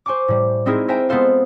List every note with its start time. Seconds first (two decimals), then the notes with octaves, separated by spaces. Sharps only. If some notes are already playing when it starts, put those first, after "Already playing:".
0.06 C5 G#5 C#6 D6
0.28 A2 G3
0.66 G#3 C4 D#4 E4 G#4 A#4
0.88 A#4 C5 E5 G5 G#5 A#5
1.09 G#3 B3 F4 A4 C5 F5